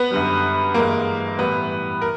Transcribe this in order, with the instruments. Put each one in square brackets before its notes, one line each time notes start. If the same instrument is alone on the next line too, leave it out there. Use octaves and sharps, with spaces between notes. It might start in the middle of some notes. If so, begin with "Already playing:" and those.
Already playing: [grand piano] B3 B4
F#2 D3 G3
G2 E3 G#3 A#3 A#4
A2 E3 G3 B3 B4
A#4